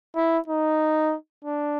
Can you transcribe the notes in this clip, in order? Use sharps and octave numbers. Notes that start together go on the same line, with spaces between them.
E4
D#4
D4